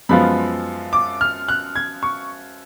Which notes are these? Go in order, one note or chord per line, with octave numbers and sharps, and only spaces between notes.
F#2 F3 G#3 B3 F4 B5
D6
F6
F#6
G#6
C#6